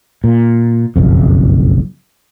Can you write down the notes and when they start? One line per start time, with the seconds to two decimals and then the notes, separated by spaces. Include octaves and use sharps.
0.24 A#2
0.96 F#1 B1 F2